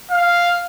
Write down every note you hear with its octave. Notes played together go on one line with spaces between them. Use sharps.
F5